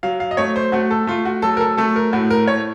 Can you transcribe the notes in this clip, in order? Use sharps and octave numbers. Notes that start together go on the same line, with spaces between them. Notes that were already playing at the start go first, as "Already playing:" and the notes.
F#3 F5
F5
D#5
A3 C#5
C5
A3 F#4
A4
A3 F4
F#4
F#3 A4
A#4
A4
A3 A4
A#4
A2 F#4
A#4
A2 C#5